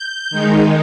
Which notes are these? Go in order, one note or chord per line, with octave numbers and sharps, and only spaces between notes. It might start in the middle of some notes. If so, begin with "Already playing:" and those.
Already playing: G6
D#3 G#3 D#4